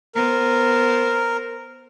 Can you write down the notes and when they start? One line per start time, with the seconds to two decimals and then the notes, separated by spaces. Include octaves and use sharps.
0.15 B3 A#4 C5